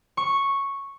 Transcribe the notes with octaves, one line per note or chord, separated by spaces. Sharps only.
C#6